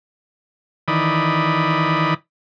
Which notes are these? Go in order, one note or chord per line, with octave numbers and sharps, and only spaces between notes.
D#3 E3 D5 B5 D#6